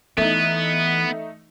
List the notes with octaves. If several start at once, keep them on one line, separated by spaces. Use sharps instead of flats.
E3 A3 B3 D#4